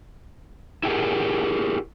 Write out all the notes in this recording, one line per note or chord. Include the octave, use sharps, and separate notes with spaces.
E4 G4 G#4 A#4